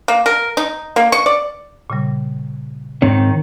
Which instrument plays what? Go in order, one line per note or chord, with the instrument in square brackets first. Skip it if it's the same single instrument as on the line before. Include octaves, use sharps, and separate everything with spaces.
[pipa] A#3
A#4
D#4
A#3
C#6
D5
[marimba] A#2 C#3 G3
[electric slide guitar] G#2 C4 C#5 [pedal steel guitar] D#3